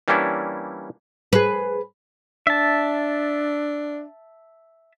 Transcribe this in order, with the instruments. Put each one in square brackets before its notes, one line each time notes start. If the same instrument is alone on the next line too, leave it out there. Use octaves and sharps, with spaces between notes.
[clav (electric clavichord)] E3 G3 A#3 C#4 D4 E4
[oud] G#4 B4
[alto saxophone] D4 [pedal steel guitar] E5 A5